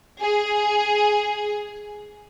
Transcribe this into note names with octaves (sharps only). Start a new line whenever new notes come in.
G#4